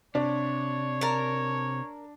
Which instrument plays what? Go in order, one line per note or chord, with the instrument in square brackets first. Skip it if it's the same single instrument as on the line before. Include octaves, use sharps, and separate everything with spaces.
[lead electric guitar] C3 [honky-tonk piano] D4 [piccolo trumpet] C#5
[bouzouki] A#4 A5